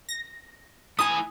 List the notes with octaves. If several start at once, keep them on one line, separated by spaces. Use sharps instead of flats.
A#6
A3 E4 G#5 D#6